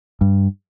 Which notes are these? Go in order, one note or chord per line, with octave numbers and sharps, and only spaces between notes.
G2